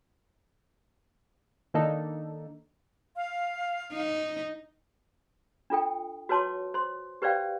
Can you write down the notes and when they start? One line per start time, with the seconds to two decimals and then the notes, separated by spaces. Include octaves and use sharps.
1.74 D#3 A#3 D4 D#4 A4
3.15 F5
3.93 D#4
5.70 D4 F4 A4 G5
6.29 F#4 B4 C#5 A5 C6 D6
6.74 C5 C6
7.22 G4 B4 C5 D5 F5 G5